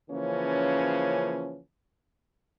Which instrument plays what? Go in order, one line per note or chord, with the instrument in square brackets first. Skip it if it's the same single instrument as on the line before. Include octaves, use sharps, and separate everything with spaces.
[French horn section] C#3 E3 F3 A#3 C#4